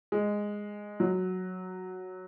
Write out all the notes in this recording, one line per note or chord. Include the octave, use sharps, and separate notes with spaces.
G#3
F#3